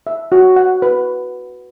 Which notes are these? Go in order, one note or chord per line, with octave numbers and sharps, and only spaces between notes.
E5
F#4
F#5
B4